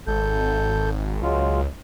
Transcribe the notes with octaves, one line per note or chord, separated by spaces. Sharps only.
G#1 A4 G6
C#2 F#3 G#3 F4